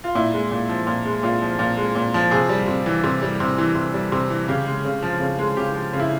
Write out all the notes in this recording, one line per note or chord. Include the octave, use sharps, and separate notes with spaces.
F4
A#2 E4
G#3
A#2
F3
A#2
G#3
A#2 F4
F3
A#2
G#3
A#2
F3
C3 G#4
G3
C3
E3
C3
G3
C3
E3
C3
G3
C3
E3
C#3 G4
G#3
C#3
F3
C#3
G#3
C#3 G4
F3
C#3
E4